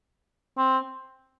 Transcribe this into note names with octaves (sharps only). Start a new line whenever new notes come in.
C4